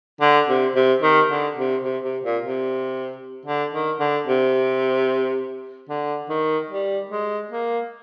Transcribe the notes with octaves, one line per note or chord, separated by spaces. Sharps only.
D3
C3
C3
D#3
D3
C3
C3
C3
A#2
C3
D3
D#3
D3
C3
D3
D#3
G3
G#3
A#3